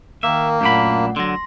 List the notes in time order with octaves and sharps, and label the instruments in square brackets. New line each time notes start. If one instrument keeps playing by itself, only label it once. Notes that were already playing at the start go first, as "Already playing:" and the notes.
[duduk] D#3 [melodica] A#3 [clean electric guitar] E5
[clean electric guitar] F#2 D4 B5 [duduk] A#2 [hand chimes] A3 F#5
[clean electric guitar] D3 F#3 [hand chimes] C6 A#6